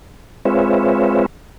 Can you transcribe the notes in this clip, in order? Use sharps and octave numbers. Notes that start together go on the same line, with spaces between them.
G#3 C4 F4 B4 C#5 E5